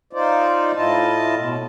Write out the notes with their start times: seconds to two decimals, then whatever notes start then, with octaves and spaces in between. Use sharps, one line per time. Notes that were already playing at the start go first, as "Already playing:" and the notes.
0.13 D#4 F4 C5 D5
0.75 A2 E4 F4 D#5 A5
1.37 B2